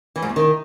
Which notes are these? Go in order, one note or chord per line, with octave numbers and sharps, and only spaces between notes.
E3
G#2
E2
D#3